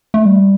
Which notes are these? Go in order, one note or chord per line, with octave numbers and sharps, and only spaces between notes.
A3
G3